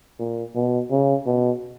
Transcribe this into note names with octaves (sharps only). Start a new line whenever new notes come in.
A#2
B2
C#3
B2